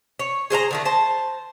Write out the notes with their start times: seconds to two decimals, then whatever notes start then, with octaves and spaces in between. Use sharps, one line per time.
0.19 C#5
0.50 G#4 C5 F5 A#5
0.71 D3 D#3 A3
0.85 C5 A5